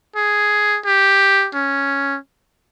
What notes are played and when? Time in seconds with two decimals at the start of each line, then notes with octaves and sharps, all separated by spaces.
0.16 G#4
0.86 G4
1.55 C#4